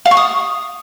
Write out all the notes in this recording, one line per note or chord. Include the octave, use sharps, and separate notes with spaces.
F5
C#6
D#6